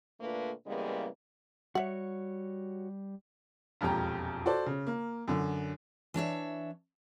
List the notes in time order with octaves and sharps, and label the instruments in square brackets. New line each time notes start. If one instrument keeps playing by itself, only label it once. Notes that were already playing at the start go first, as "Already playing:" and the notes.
[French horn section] A#2 D3 A3 A#3 F4 B4
C#3 E3 G3 G#3 A#3 B3
[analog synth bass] G3 [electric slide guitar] F#4 C#5 [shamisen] E5 F#5
[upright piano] E1 A#1 F2 G4 A#5
F#4 A4 C5 D5
C#3
A#3
F#2 D3
[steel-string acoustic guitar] E3 D4 C#5 E5